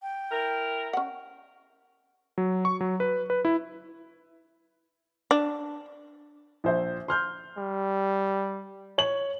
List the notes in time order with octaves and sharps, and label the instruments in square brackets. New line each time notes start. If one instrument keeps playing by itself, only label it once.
[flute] G5
[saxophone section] E4 A#4
[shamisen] C#4 F#5
[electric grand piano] F#3
C#6
F#3
B4
B4
E4
[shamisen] D4
[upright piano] A#1 C5 E5
C6 F6 G6
[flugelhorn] G3
[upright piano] C#5 F#7